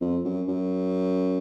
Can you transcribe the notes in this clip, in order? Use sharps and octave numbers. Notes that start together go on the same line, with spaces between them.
F2
F#2
F#2